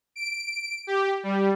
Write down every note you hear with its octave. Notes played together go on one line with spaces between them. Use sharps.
D7
G4
G3